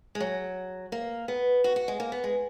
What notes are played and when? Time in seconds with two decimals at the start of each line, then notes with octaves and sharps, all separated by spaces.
0.15 G#3
0.20 F#3
0.92 A#3
1.28 B3
1.64 F#4
1.76 F#4
1.88 G#3
2.00 A#3
2.12 B3
2.24 G#3